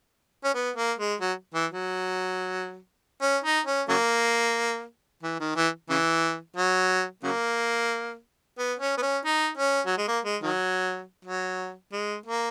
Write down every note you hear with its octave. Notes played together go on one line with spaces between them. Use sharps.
C#4
B3
A#3
G#3
F#3
E3
F#3
C#4
D#4
C#4
C#3 F#3 A#3
E3
D#3
E3
C#3 E3
F#3
C#3 F#3 A#3
B3
C#4
B3
C#4
D#4
C#4
F#3
G#3
A#3
G#3
D#3 F#3
F#3
G#3
A#3